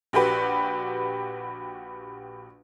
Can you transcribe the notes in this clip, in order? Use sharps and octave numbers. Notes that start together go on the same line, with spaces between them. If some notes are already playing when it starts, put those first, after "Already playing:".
A#1 F#4 G4 B4